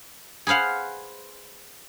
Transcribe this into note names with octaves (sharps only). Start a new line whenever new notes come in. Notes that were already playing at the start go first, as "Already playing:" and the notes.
G#4 B4 C5 F5 F#5